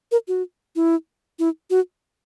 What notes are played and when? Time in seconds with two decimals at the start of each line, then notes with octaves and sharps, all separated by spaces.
0.12 A#4
0.28 F#4
0.76 E4
1.39 E4
1.70 F#4